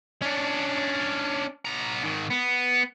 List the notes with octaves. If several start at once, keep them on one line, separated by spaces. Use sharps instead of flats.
C#4 D4
B3 A#5
G#2 D#3
B3